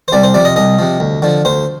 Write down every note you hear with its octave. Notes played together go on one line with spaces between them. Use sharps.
C5
C2 D5
C5
C3 F3 D5
D#5
C2 D#5
C3 F3
D2
D3 F3
D2 C5